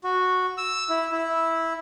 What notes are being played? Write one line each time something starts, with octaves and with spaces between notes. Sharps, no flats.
F#4
E6
E4
E4